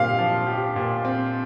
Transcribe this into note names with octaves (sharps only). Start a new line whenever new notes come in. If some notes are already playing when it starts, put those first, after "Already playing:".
Already playing: A#2 C4 G4 F5
F3
G4
A#2
C4